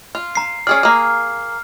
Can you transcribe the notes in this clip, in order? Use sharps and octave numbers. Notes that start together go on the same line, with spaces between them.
F4
A#5 C7
C#4 G#4 D5 F6
A#3 G#4